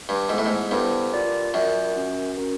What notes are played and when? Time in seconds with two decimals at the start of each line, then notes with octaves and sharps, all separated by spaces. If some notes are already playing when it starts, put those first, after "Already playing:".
0.09 G2
0.29 G#2 B3 E4 A4 C5
0.38 A2
0.46 G#2
0.71 G2 B3 E4 A4 C5
1.13 F4 A#4 D5 F#5
1.54 F#2 F4 A#4 D5 F#5
1.96 C#4 F#4 A#4
2.38 C#4 F#4 A#4